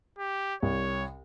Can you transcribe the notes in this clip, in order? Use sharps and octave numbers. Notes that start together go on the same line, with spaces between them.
G4
C2 C#5